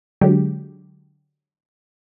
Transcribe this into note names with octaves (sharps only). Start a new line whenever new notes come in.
D3 F#3 G#3 G4